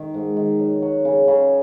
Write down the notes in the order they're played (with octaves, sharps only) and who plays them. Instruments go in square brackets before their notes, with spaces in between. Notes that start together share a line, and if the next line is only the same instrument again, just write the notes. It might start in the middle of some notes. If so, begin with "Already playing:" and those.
Already playing: [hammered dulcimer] D#3
G#2
D#3
F#3
F#3
C#3
C#3